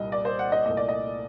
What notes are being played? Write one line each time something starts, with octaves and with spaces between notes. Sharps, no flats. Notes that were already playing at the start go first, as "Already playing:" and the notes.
Already playing: C2 A#2 G3 A#3 D#5
D5
C5
F#5
D#5
C2 A#2 A3 D#5
D5
D#5